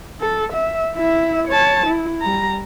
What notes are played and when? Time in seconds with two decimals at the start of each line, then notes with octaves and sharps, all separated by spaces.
0.20 A4
0.53 E5
0.96 E4 E5
1.48 C#5 A5
1.86 E4
2.21 G3 A#5